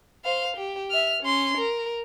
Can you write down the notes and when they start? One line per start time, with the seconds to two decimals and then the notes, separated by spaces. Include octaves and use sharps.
0.24 C5 F5
0.57 G4
0.91 E5 F6
1.23 C#4 C6
1.57 A#4